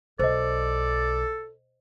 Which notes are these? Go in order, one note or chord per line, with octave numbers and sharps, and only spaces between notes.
B1 A4 C5 D5 D#5